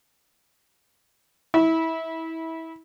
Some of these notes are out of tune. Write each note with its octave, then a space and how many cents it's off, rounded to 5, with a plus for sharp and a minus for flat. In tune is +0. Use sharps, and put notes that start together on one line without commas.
E4 -25